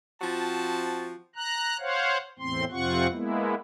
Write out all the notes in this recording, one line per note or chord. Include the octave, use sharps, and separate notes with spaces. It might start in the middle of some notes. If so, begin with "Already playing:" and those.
F3 C4 F#4 A5
A#5 F#6
C5 C#5 F5 F#5
E2 A2 C4 C6
F2 C3 C4 F4 F#5 C#6
G#3 A#3 B3 E4